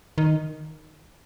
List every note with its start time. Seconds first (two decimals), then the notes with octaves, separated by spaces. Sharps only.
0.18 D#3